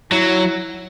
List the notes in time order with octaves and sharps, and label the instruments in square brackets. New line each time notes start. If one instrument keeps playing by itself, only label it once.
[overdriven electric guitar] F#3 [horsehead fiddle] E4